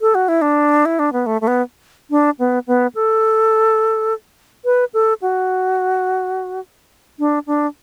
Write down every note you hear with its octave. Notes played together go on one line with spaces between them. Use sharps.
A4
F#4
E4
D4
E4
D4
B3
A3
A3
B3
D4
B3
B3
A4
B4
A4
F#4
D4
D4